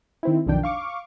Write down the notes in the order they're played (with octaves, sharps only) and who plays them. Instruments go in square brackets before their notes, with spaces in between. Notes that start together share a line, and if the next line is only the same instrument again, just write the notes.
[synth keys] D#3 C4 E4
B1 F2 D#3 D4 G5
F5 C#6 D6